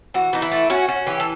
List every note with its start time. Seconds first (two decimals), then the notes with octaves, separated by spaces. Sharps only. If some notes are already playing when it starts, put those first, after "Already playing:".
0.14 E3 F#4
0.33 E3 D#4
0.42 E4
0.52 A3
0.70 C#4 F#4
0.88 C#4 F#4
1.07 E3 G4
1.20 A4